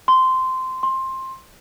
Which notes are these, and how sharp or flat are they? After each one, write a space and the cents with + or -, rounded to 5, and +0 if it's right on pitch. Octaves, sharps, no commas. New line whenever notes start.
C6 -15
C6 +15